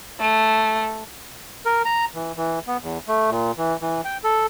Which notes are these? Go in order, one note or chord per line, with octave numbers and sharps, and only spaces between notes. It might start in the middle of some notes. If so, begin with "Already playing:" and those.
A3
A#4
A#5
E3
E3
B3
E2
A3
A#2
E3
E3
G5
A4